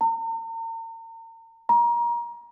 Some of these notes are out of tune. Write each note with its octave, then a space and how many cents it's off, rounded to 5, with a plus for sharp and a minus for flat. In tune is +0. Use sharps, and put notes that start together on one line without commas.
A#5 -40
A#5 +25